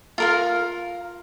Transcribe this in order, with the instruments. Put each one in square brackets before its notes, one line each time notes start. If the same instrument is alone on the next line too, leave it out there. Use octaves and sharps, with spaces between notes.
[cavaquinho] F4 A#4 F5